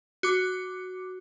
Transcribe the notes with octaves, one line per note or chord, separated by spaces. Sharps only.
F#4 D6